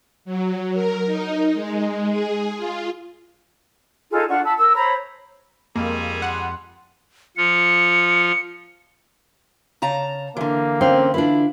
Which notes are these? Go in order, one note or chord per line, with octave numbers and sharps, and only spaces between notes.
F#3
A#4
D#4
G#3
G#4
F4
D#4 F4 G#4 A4
D4 F4 F#5 C#6
A5 B5 E6
A#4 E6
C5 C#5 A#5 B5
F2 G3 G#3 A#3 C4 G#4
F#5 C6
F3 F4 C#7
C#3 A5 A#5
D3 E3 A#3
C4 C#4 F5
D4 E4 F4 B4